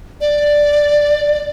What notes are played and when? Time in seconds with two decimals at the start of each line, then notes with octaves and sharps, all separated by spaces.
0.21 D5